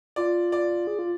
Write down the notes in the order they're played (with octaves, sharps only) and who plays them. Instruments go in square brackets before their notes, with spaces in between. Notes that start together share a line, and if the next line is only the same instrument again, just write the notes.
[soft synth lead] F4 [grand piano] D5
[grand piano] D5
[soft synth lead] G#4
F4